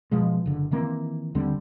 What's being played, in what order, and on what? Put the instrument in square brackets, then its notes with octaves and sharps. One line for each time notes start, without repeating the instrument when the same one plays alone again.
[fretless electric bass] B2 F3 G#3
F#1 D3
D#3 E3 A#3 C4
D#2 D3 G3 C4